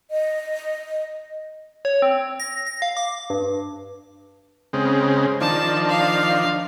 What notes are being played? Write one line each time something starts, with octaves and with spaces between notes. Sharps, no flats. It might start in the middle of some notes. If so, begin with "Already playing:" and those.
D#5
C#5
C4
A#6
A#6
F5
D6
G2
C#3 G#3 C4
D#3 F3 D4 A5
F5